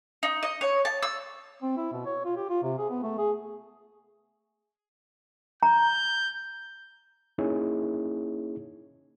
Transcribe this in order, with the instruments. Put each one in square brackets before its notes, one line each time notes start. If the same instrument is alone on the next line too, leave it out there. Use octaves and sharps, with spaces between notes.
[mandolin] D#4
D#5
C#5
A5
E6
[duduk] C4
E4
B2
C#5
F4
G4
F4
C3
G#4
B3
A3
G#4
[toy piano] A#5 [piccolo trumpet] G6
[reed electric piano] A#3 C#4 D#4 E4 G#4 C#5